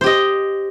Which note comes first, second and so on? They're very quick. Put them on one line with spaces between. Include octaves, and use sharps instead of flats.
C5 G4 D#5